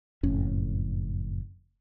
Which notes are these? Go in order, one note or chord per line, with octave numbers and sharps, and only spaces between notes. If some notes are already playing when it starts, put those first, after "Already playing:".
F#1 F2 A2 C#4